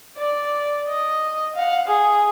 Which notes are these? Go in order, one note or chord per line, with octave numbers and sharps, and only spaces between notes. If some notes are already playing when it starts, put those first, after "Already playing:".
D5
D#5
F5 F#5
G#4